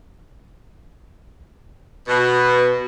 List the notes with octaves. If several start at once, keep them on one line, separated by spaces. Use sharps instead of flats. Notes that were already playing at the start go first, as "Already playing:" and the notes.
B2